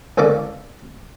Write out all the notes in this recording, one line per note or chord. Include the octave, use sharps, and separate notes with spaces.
C#2 E3 A#3 A4 D5 D6